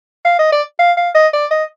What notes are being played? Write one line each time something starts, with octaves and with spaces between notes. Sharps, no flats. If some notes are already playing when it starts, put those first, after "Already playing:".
F5
D#5
D5
F5
F5
D#5
D5
D#5